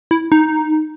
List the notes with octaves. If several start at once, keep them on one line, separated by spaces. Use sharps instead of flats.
E4
D#4